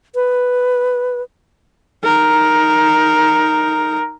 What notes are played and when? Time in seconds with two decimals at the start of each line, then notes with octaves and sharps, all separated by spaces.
0.15 B4
2.04 D#4 A#4